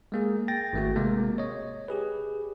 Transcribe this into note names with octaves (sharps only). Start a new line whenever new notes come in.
G#3 A#3 G#4
G5 A6 A#6
G#1 A3 F#4
C3 G#3 A#3
C#5 D#5
G4 G#4 B4